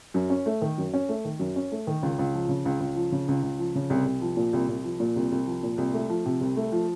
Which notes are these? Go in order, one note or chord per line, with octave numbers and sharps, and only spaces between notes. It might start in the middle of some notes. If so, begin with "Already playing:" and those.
F#2
C#4
A3
D#3
F#2
C#4
A3
D#3
F#2
C#4
A3
D#3
C#2
C#2
F3
C#3
C#2
C#2
F3
C#3
C#2
C#2
F3
C#3
C2
C2
F3
A#2
C2
C2
F3
A#2
C2
C2
F3
A#2
C2
A3
F3
C3
C2
A3
F3